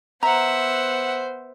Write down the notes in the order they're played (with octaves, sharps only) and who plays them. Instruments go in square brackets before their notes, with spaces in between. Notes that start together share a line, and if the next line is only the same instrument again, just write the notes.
[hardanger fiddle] B3 C5 [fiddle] E5 F#5 [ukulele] A#5